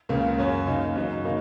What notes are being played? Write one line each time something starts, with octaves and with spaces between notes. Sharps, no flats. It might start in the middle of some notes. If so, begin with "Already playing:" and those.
C#2 C#3 A#3
F#2 F#3 C#4
C#3 A#3 D#4
F#2 F#3 D#4
C#3 A#3 D#4